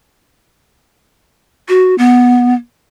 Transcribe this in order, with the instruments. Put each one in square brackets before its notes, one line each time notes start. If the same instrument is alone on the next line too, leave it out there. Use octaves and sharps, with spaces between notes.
[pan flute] F#4
B3